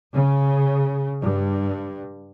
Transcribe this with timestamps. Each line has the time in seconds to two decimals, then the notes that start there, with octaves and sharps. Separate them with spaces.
0.15 C#3
1.23 G2